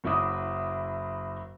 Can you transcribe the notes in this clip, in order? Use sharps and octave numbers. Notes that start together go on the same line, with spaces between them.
F#1 F#3 E4 E5 D6 D#6